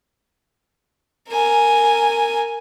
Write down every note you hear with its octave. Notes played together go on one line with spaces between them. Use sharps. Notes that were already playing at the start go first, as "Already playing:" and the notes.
A#4 G#5